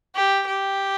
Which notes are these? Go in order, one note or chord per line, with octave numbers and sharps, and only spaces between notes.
G4
G4